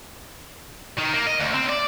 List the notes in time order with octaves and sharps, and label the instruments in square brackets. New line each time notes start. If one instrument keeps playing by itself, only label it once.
[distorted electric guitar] D#3
A#3
D#5
D2
C4
D5